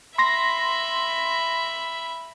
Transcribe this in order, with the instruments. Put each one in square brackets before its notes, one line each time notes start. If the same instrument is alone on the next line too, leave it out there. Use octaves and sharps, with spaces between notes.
[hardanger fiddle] E5 B5 [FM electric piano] C6 A#6